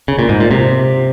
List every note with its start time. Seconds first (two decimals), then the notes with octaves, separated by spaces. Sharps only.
0.08 C#3
0.19 A#2
0.29 G#2
0.40 A#2
0.51 C3